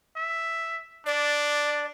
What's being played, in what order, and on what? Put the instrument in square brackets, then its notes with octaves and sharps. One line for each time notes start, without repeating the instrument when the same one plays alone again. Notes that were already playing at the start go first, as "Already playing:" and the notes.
[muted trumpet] E5
[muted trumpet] D4 [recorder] D5